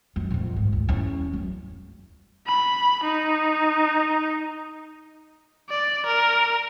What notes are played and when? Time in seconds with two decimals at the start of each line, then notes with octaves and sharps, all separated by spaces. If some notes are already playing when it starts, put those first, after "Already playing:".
0.16 F#2
0.30 A#1 F2
0.56 G#2
0.73 D2
0.89 E2 C#4
1.33 F#2
2.47 B5
3.04 D#4
5.69 D5
6.06 A#4